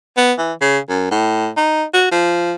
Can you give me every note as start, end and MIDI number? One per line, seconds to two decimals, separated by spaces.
0.17 0.33 59
0.39 0.53 52
0.61 0.78 49
0.90 1.09 42
1.11 1.49 45
1.57 1.84 63
1.94 2.08 66
2.11 2.55 53